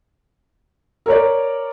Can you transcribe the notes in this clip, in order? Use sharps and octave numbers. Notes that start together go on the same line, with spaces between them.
A#4 C#5 D5